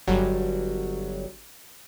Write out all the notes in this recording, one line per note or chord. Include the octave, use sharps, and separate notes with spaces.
G1 F#3 G3